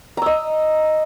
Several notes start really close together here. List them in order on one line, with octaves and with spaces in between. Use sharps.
A#5 E6 D#5